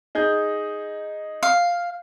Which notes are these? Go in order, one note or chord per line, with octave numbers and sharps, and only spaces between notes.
D#4 G#4 G6
F5